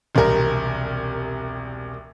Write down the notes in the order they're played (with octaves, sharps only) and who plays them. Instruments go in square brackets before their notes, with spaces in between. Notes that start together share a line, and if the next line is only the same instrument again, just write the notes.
[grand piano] E1 C2 G3 A#4